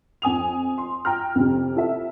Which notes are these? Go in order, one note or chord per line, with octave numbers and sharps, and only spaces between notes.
F2 G#5 D#6 F7
C6
G5 A#5 F6
F2 C3
E4 A4 E5